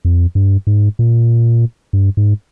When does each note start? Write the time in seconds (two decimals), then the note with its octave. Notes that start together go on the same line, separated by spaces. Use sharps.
0.05 F2
0.35 G2
0.67 G#2
0.99 A#2
1.93 G2
2.17 G#2